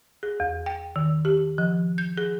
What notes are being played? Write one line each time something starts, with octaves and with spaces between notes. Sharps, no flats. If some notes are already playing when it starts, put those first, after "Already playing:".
G#4
E2
G5
D#3
G4
F3
G6
G#4